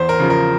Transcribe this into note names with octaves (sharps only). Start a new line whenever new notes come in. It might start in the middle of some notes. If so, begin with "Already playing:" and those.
Already playing: E2 C5
A#4
C#3 F3
A#4